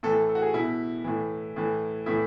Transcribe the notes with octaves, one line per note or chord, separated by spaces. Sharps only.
A2 E3 A4
A4
A4
F#4
G#4
B2 E4
A2 E3
A2 E3
A2 E3 E4